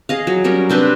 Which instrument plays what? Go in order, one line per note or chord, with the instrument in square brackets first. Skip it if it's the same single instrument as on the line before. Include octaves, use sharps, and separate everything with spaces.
[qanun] G#4 D#5 F5
F#3
F#3 G3 C#4 A#4
C3 C4 D4 B4